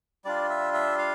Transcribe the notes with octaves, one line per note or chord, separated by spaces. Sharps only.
G3 D4 F4 D5
E5
E5
F5